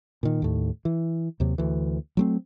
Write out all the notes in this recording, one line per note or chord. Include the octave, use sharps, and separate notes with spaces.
A#2 D#3
D#2 A2
E3
D#2 C3 F#3
D2 E3
F#3 A3 C4